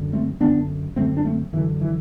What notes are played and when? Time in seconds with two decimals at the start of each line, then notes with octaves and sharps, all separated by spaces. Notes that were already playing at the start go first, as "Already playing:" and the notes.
Already playing: F#2 D3
0.13 A3 C4
0.41 F#2 D3 B3 D4
0.96 F#2 D3 A3 C4
1.17 D4
1.24 A3 C4
1.53 F#2 D3 E3
1.81 E3